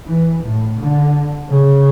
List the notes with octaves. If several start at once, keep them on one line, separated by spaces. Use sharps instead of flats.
E3
A2
D3
C#3